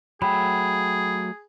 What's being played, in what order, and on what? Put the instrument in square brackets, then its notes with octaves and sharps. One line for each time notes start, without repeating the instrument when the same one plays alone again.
[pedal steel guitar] F#3 A3 [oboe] G#4 [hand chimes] G5 B5